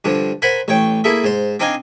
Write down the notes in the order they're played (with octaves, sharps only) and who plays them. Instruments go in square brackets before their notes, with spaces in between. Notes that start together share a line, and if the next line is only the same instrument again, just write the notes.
[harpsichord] G2 D3 F3
A#4 C5 F#5 G#5 B5
A1 C#5 G5
A#3 E4 G#4 A4 E5
G#2 C5
C4 D4 D#4 D#5 F5 G#5